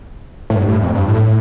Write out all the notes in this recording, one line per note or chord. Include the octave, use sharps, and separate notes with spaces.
A2
G2
A2
F2
G2
A2